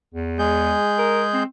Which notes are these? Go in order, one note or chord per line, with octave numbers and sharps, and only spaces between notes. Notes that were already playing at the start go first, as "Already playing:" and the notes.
E2
G#3 G#4 G6
A#4
C4